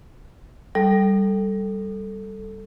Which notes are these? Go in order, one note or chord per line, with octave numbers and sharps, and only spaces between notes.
G3 A4